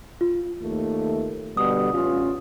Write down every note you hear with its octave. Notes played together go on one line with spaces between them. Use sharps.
F4
D#2 A3
B2 D3 G3 D#6
A1 C#4 F4